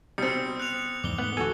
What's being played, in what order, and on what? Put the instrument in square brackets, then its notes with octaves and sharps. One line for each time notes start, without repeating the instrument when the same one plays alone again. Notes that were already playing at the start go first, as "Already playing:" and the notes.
[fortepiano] B2 C4 [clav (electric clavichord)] G3 [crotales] D#6 C#7
[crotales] F#6 F7
[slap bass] E2 G#2 [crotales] D6 G7
[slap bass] G#2 A3 [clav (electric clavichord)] B3 F#5
[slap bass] D2 G#2 E3 [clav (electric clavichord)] F#4 G#5 [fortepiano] A4